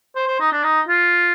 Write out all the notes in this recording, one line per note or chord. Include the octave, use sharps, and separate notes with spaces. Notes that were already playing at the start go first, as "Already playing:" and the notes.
C5
C5
D#4
D4
D#4
F4